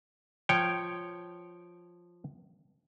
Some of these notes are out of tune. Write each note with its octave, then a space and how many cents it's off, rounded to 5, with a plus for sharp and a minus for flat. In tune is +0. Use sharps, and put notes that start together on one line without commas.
F3 +0 C#5 +0 G5 -10